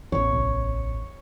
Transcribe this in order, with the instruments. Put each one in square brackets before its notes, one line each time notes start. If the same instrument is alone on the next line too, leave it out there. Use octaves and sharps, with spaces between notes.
[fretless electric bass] A1 E2 [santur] C#5
[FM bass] C2